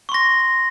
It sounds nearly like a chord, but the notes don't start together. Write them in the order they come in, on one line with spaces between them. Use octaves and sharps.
C#6 C6 A#6